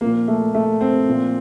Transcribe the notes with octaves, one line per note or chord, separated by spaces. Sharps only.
A#2 F3 A#3
A3
A3
C4
A#2 F3